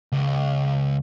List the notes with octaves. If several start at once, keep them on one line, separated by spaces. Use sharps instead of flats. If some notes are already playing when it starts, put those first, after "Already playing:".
C#2